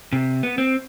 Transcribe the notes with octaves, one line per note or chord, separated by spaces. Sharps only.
C3
B3
C4